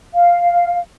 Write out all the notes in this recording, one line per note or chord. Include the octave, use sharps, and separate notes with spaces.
F5